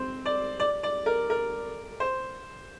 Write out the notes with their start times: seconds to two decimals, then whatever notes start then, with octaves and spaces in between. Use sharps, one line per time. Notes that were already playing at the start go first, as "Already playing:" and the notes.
Already playing: C4 C5
0.26 D5
0.60 D5
0.83 D5
1.06 A#4
1.30 A#4
2.00 C5